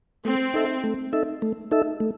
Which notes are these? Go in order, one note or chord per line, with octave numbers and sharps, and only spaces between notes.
A3 C4
D#4 A4 E5
A3
D#4 A4 E5
A3
D#4 A4 E5
A3